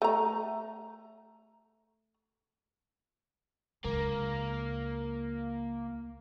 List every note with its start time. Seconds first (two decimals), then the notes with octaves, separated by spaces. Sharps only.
0.02 A3 A#5
3.85 C#2 A#3